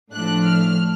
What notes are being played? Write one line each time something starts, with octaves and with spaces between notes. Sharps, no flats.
A2 F3 A3 D4 F#6
F6